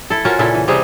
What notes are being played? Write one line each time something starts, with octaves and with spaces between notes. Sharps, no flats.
E4 A4
C#4 F4 F#4 A#4
A#2 C#3 E4 A4
E3
C3 G3 C4 G#4